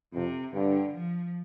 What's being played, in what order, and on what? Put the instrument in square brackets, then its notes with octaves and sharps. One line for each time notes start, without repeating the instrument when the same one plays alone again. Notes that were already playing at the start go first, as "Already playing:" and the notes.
[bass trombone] F2 [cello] C3
[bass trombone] G2 [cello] D3
[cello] F3